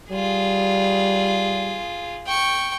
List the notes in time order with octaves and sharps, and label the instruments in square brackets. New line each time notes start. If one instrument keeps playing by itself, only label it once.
[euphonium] G3 [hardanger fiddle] F4 G#4
[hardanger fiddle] G5 C#6